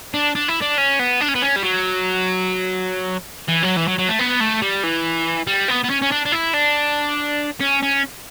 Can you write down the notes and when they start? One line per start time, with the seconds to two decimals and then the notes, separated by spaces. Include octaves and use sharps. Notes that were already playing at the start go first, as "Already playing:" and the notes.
0.14 D4
0.35 D4
0.48 E4
0.62 D4
0.78 C#4
1.00 B3
1.21 D4
1.29 C#4
1.35 B3
1.42 C#4
1.56 G3
1.63 F#3
3.48 E3
3.63 F#3
3.76 E3
3.88 F#3
3.98 F#3
4.08 A3
4.19 B3
4.40 A3
4.62 G3
4.83 E3
5.47 G3
5.68 B3
5.84 B3
5.90 C#4
6.02 C#4
6.11 D4
6.26 D4
6.32 E4
6.54 D4
7.60 C#4
7.82 C#4